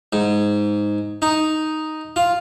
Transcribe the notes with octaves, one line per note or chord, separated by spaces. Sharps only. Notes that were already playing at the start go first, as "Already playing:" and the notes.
G#2
D#4
F4